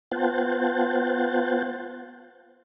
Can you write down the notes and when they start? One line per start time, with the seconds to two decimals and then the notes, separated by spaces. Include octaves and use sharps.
0.11 B3 F4 C5 F#5 G5 A5